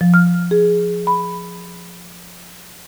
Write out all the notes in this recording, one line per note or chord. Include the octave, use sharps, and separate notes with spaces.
F3
F6
G#4
B5